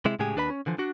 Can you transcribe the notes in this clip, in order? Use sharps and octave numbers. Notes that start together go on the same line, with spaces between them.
C3 G#3 E4
A2 C#3 G#3 G4 G#4
D#2 D4 B4 C#5 B5
C#4
D3 E3 F3
D4 F#4